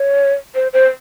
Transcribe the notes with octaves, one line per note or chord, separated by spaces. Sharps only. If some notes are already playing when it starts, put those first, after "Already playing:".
Already playing: C#5
C5
C5